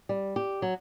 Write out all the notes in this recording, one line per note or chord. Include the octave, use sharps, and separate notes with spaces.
G3
G4
F#3